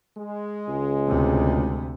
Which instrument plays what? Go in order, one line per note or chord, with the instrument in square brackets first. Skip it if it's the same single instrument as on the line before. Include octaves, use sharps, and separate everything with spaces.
[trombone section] G#3
[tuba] C#2
[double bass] D2 C3